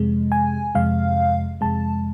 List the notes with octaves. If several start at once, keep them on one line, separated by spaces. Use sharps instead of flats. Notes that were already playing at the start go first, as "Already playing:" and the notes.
Already playing: F2 C3 G#3
G#5
F2 C3 G#3 F5
F2 C3 G#3 A5